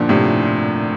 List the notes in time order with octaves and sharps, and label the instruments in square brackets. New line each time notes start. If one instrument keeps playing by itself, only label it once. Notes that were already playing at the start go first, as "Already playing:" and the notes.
Already playing: [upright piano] A#2 D3 F3
A2 C3